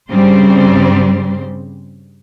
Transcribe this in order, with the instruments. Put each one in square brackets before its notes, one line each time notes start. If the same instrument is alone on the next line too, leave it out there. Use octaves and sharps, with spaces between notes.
[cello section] G2 C#3 G3 C4 C5